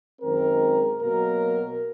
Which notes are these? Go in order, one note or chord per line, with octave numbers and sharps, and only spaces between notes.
F#2 D#3 G#3 C4 A#4
B2 F#3 A#3 A#4